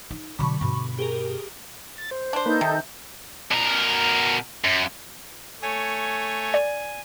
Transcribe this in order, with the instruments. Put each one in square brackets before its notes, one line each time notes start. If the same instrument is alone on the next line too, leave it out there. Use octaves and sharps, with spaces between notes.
[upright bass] D#4
[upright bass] B2 F#3 [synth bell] D3 B5 C#6
[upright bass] G2 B2
[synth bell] G4 G#4 A#4
[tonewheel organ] A6
C5
[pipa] D4 C5
[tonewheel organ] A#3 B4 [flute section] D#4 A4 G6
[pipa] C3 [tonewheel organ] D#3
[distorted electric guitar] B2 A#4
F#2
[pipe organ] A3 C#5 [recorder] G#5
[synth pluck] D5